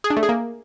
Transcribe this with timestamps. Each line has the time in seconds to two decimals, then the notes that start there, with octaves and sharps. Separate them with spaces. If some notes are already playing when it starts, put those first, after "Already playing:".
0.04 G#4
0.10 D4
0.17 A3
0.23 G#4
0.29 A#3